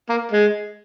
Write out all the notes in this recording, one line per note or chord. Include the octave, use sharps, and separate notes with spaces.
A#3
G#3